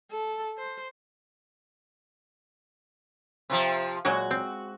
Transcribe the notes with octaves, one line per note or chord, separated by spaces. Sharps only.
A4
C5
C3 D#3 F3
A#2 F#3 G#3 F#4
C4